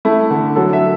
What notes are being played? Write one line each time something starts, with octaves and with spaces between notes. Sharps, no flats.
A3 E4
D3
F#3 A4
E5